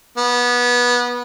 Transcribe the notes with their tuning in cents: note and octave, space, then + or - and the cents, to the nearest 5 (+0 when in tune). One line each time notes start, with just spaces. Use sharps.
B3 -20